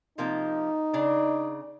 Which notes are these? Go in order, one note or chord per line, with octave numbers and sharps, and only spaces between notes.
C3 F3 A#3 D#4
C#3 D4